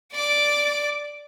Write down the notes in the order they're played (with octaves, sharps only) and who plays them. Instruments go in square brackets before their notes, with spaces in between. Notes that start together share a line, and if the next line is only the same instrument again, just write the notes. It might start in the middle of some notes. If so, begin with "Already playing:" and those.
[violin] D5 D6